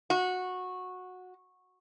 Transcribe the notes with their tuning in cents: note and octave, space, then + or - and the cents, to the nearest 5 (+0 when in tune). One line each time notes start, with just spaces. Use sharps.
F#4 -15